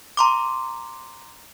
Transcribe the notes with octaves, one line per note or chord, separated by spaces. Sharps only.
A#5 C6 D6